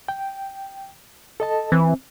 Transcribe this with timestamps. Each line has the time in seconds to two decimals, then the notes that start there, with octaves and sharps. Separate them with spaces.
0.08 G5
1.40 A4 D#5 A5
1.72 E3 C4